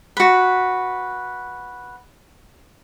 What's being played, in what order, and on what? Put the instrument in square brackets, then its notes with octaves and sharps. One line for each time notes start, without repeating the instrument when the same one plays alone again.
[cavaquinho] F#4 B4